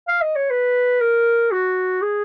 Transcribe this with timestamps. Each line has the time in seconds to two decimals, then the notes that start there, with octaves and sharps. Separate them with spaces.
0.08 F5
0.22 D#5
0.36 C#5
0.50 B4
1.01 A#4
1.51 F#4
2.02 G#4